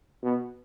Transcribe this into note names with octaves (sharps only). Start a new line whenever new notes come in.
B2